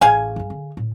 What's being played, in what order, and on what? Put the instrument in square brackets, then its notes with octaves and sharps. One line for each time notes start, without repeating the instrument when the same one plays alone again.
[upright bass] A1 [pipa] G#4 F5 G#5
[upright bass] G2 D#4
D3
A2